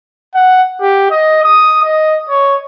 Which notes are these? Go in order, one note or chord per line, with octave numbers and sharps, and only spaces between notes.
F#5
G4
D#5
D#6
D#5
C#5